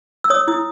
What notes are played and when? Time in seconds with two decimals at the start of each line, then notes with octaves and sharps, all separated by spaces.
0.24 E6
0.30 C#5 D#6
0.48 E4 D#6